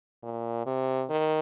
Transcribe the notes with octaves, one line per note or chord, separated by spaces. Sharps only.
A#2
C3
D#3